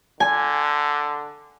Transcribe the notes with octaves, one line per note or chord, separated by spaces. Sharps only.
D3 G#5